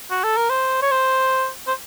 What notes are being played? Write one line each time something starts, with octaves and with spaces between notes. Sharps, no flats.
F#4
A4
A#4
C5
C#5
C5
C5